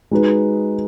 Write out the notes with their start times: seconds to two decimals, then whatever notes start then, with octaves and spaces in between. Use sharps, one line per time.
0.11 G#3 D#4 F#4 B4